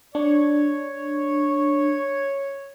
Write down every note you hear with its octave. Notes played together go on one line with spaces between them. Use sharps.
D4 C#5